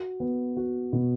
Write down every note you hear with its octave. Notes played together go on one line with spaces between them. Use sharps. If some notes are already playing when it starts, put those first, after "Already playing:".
Already playing: F#4
B3
F#4
B2